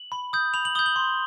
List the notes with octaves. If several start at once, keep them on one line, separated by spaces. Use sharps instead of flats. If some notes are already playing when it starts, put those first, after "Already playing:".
Already playing: F#7
B5
D#6 G6
B5 F7
F#7
D#6 G6 G7
F#7
C6